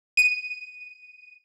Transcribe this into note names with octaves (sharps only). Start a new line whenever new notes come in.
D#7